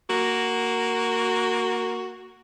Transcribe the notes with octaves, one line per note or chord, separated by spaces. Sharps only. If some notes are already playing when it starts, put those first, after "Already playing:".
A#3 F#4